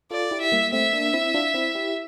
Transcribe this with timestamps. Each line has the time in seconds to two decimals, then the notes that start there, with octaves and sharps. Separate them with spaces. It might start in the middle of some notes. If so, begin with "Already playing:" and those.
0.11 F4 A4 D5
0.31 E4 G4
0.41 E5
0.52 G3 A#3
0.73 A3 C4 E5
0.93 A#3 D4
1.13 C4 E4
1.34 D4 F4
1.54 C4 E4
1.75 E4 G4